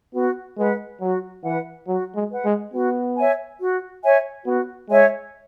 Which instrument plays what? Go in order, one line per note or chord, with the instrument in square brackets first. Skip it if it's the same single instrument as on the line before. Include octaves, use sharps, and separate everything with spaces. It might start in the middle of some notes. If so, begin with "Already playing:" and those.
[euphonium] B3 [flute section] F#4
[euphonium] G#3 [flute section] B4 F#5
[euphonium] F#3 [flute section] F#4
[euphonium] E3 [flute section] B4 F#5
[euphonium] F#3 [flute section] F#4
[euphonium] G#3
[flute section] B4 F#5
[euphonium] G#3
[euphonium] B3 [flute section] F#4
[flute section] C#5 E5 G#5
F#4
C#5 E5 G#5
[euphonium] B3 [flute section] F#4
[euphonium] G#3 [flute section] C#5 E5 G#5